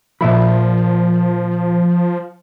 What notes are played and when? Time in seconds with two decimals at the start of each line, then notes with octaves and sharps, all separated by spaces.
0.21 A#2 F3 E5 B5